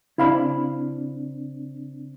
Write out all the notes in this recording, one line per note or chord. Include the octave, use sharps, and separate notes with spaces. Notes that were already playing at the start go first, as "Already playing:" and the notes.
C#3 C4 D4 E4 F5 B5